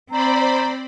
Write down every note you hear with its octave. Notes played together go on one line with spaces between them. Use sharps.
C4 C5 D5 A#5 B5